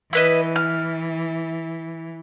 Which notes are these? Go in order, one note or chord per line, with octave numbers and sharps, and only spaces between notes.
E3 E4 B4 D#5
F6